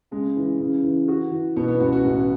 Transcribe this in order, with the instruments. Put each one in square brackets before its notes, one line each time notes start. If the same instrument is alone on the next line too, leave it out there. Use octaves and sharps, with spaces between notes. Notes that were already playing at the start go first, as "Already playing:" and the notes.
[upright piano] C#3 [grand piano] G#3
[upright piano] E3
C#3
E3
F#4
E3
[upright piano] B2 [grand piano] B3
[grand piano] B3
[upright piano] C#2 [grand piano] F#4
[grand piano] F#4
[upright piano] A1